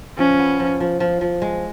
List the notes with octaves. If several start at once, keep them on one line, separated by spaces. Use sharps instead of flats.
F3 C#4
B3
F3
F3
F3
F3
G#3